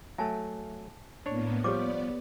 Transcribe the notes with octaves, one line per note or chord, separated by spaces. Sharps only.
F#3 A3 E5 G#5 A5
A2 A#3 B3 D4 C#5
F3 G3 B3 G4 C#5 D5 D6